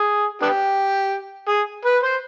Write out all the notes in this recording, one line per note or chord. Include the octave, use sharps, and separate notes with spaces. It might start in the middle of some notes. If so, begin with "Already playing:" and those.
Already playing: G#4
B3 D4 G4
G#4
B4
C5